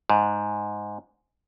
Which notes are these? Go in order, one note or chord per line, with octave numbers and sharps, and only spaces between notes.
G#2